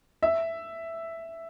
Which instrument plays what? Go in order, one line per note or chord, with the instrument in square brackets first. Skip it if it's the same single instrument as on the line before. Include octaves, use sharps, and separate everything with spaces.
[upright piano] E5